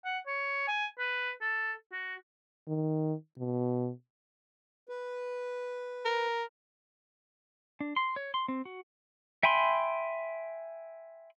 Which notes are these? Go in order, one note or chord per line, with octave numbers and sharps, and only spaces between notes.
F#5
C#5
G#5
B4
A4
F#4
D#3
B2
B4
A#4
D4
C6
C#5
C6
C4
F#4
E5 G5 G#5 B5 C6